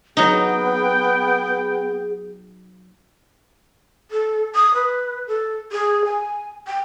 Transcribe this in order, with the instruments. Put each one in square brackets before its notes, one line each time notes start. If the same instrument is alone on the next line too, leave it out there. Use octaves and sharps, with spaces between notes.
[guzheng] F#3 D#4 [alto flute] B3 [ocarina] G#4 [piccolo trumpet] G5
[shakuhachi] A4
D#6
B4
A4
G#4
G#5
G5